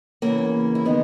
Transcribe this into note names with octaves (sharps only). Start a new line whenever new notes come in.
E2 C#3 E3 A#3 C#4
E4
D#3 G#3 B3 D#4